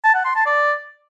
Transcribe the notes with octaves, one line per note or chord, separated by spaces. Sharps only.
A5
F#5
C6
A5
D5